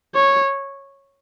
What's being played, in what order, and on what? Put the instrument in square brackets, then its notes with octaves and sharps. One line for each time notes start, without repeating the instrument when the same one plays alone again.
[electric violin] C#5